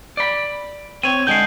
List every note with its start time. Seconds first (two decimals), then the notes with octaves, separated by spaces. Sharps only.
0.17 D5 B5
1.03 C4 C#5 D#7
1.27 D3 G#3 G6 C7